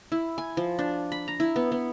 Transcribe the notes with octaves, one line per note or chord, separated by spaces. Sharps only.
E4
G#5
F3
D4
B5
A#5
E4
B3
B3